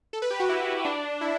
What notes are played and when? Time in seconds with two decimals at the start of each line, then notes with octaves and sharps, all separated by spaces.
0.13 A4
0.22 B4
0.30 G4
0.40 F#4
0.49 E4
0.85 D4
1.21 E4